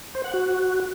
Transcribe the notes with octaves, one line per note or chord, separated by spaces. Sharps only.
C5
F#5
F#4